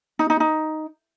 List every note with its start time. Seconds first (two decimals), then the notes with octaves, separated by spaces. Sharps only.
0.19 D#4
0.30 D#4
0.40 D#4